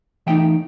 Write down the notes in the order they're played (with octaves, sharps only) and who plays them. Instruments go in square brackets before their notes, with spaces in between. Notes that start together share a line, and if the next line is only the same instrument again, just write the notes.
[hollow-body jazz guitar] E3 A3 D#4 E5 G5